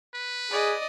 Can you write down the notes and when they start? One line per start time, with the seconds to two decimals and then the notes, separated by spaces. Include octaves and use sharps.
0.14 B4
0.51 G#4 D5 D#5